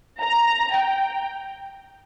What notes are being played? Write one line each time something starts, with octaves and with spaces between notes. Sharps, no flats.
A#5
G5